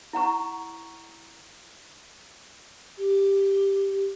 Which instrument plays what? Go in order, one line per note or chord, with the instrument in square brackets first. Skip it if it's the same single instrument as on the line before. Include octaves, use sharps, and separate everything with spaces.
[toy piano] E4 F#5 A#5 C#6
[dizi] G4